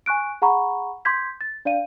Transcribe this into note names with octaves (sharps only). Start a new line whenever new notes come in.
G#5 C#6 F#6 D7
G#4 F#5 A#5 B5 C#6
C6 D6 G6 G#6 B6
A6
D4 D5 F5 D#7